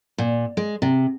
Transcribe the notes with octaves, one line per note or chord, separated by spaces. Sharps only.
A#2
G#3
C3